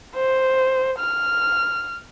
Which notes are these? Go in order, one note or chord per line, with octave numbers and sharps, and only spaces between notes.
C5
F6